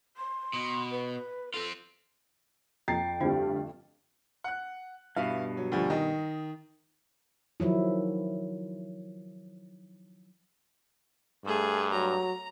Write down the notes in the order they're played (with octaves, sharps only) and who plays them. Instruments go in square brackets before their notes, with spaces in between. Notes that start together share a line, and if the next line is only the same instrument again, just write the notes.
[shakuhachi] C6
[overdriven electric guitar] B2
[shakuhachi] B4
[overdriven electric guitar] C4 F4 [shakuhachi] A4
[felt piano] F2 A6 C7 [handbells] G5 [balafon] A#5
[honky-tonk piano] D2 G2 G3 [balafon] C4 F4 C5
[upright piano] F#5 F#6
[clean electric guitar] G2 B2 [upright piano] E4 F5
[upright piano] F#3
D2 F3 G3
D#3 D#5
[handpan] D#3 F3 F#3 E4
[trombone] G2 [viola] A3 G#4
[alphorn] F#3 [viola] A#5